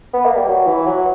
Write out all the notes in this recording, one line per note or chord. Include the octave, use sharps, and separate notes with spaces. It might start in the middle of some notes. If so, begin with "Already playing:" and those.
B3
A#3
G3
F#3
E3
F#3